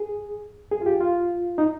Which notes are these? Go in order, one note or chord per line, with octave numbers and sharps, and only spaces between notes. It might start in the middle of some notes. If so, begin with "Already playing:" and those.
Already playing: G#4
G#4
F4
G4
F4
D#4